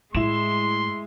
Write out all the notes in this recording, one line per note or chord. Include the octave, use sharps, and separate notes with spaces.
A2 G#3 E4 C6 E7